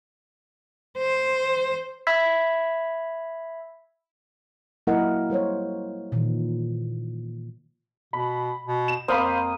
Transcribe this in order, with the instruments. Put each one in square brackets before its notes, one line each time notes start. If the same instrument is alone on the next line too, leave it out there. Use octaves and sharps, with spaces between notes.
[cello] C5
[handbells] E5 B5 E6 G#6 B6
[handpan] F#3 A#3 E4 A#4 D#5 F#5
G3 A#4 C5 C#5
A#2 D#3 E3
[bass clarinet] B2 [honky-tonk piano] B5
[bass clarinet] B2
[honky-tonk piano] E7
[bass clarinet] F2 [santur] A#3 D#6 [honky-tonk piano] C5 F5 B5